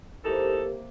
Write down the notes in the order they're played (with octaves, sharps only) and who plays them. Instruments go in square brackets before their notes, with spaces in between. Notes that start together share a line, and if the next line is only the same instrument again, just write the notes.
[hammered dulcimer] C3 A#3 [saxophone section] E3 D#4 A4 [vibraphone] G4 A#4